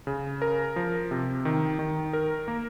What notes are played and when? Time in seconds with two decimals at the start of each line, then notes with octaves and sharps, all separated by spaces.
0.07 C#3
0.42 A#4
0.76 F3
1.11 C3
1.45 D#3
1.79 D#3
2.13 A#4
2.48 A#3